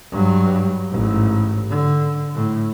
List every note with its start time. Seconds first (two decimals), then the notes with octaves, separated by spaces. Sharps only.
0.12 G2 F#3
0.89 A1 G#2
1.70 D3
2.35 A2